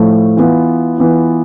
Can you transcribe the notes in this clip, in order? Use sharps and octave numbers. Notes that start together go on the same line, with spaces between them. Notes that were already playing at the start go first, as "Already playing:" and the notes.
Already playing: A2 F3 A3
E3 B3 F4
E3 B3 F4